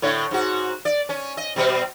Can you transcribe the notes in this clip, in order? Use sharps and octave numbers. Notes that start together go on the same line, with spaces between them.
A2 D3 C#5
G#2 F#4
D5
C#4
D#5
B2 G3 C4